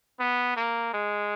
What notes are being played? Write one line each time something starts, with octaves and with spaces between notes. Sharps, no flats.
B3
A#3
G#3